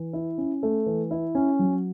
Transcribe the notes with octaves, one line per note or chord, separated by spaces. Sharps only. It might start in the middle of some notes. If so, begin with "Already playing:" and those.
Already playing: E3
E4
C#4
A3
E3
E4
C#4
F#3